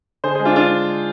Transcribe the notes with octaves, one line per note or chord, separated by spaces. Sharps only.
D3 G#4 C5
G#3 G#4 C5
D4 F4
G#3 D4 F4